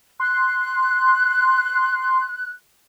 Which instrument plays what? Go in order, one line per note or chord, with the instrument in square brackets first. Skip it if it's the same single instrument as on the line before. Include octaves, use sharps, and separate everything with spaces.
[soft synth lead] C6 [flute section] F#6